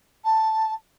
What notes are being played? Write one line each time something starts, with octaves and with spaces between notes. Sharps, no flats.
A5